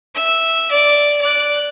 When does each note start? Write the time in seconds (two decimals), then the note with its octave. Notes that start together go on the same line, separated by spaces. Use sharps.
0.15 E5
0.71 D5
1.21 D5 F#6